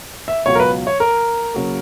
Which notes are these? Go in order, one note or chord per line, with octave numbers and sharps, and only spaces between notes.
E5
C#2 B2 F#3 C#5
A#4
B4
C#5
A#4
C#3 F#3 A#3